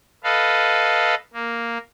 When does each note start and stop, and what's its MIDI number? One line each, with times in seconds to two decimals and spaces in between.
0.24 1.15 69
0.24 1.15 71
0.24 1.15 75
0.24 1.15 77
1.34 1.78 58